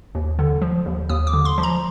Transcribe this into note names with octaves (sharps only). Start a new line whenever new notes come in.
D#2
D3
F3
D#2
D#2 D#6
D6
D3
C6
F3
A#5